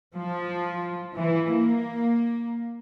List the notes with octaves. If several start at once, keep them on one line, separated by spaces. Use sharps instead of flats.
F3
E3
A#3